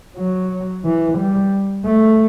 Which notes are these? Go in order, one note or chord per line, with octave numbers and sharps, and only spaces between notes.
F#3
E3
G3
A3